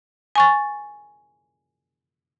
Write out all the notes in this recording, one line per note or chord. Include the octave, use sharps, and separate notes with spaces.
G#5 C#6 A6